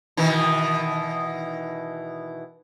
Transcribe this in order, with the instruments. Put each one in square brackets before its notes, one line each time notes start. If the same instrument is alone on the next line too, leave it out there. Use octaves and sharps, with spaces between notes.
[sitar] B2 D#3 E3